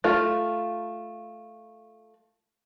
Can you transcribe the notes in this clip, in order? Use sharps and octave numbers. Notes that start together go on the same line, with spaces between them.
A3 F4